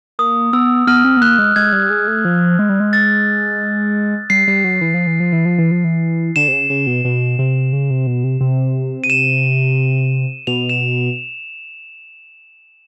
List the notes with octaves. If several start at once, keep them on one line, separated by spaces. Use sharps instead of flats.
A#3 D#6
B3 E6
B3 F6
C4
B3
A#3 F#6
G#3
G#3 G#6
G3
G#3
A3
F3
G#3
G3
G#3
A6
G3 C7
G3
F#3
E3
F3
E3
F3
E3
F3
E3
F3
E3
D3 E7
C3
C#3
C#3
B2
B2
C3
C#3
C3
B2
C3
C3
D#7
E7
B2 F7
E7